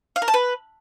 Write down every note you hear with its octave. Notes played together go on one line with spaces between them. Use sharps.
F5
A#4
A5
B4